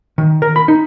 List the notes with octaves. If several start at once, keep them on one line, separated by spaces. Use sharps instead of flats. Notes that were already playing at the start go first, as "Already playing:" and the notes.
D#3
A#4
B5
D#4